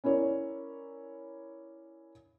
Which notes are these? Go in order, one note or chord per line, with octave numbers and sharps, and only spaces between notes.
C#4 E4 A#4 C#5 D5